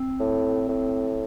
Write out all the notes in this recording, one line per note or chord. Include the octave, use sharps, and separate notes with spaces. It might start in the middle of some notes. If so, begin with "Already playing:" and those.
Already playing: C4
A2
A2